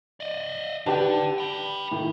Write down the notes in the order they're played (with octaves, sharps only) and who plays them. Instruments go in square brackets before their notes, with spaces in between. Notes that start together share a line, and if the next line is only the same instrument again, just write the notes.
[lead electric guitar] D5 D#5
[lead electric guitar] D3 D5 [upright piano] G4 B4 A5
[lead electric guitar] G5 B5
[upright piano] A2 D#3